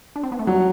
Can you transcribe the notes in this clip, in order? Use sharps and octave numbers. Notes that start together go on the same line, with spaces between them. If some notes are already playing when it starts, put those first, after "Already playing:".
D4
C4
B3
A3
F#3 G3